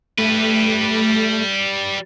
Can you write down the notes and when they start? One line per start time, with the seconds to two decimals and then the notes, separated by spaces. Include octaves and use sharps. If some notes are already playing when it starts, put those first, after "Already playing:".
0.18 G3 A3 B4